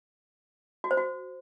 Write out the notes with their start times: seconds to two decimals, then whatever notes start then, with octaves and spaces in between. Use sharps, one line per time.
0.84 F#4
0.91 C5
0.97 F#4